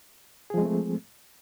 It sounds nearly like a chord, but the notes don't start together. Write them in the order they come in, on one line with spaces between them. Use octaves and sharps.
G#4 F3 G#3 C4 A3